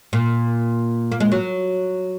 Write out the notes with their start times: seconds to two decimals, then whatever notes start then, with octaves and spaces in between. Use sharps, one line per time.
0.13 A#2
1.12 A#3
1.20 G#3
1.32 F#3